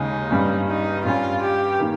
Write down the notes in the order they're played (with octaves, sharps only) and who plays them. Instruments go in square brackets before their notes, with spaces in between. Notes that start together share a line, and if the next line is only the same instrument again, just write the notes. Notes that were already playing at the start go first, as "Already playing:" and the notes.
Already playing: [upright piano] D#2 C#3 G#3 [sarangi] D#4
[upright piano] G2 G3 C#4
[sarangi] D#4
[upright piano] G2 G3 C#4 [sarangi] F4
[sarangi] G4
[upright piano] D#3 A#3